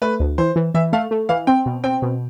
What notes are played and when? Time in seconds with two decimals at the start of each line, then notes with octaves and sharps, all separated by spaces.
0.02 A3 B4
0.20 D2
0.38 E3 C5
0.56 E3
0.74 E3 E5
0.93 A3 F5
1.11 A3
1.29 E3 F5
1.47 C4 G5
1.66 B2
1.84 C4 G5
2.02 B2